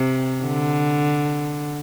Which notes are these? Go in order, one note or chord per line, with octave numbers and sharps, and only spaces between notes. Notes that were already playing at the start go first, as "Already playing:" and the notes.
Already playing: C3
D3